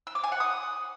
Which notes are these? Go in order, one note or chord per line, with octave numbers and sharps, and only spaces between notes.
E6
D6
G#5
F#5
D#6